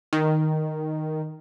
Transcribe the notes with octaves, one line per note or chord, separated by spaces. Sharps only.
D#3